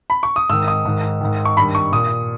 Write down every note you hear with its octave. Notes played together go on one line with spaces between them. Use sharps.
B5
C#6
D#6
G#2 D#3 E6
D#6
G#2 D#3
G#2 D#3
C#6
G2 D#3 B5
C#6
A#2 D#6